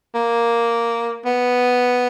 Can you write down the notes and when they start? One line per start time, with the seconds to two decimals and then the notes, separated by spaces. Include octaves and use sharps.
0.15 A#3
1.25 B3